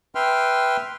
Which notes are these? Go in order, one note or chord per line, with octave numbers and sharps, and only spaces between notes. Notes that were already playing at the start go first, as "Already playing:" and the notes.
B4 E5 G5 C6 F6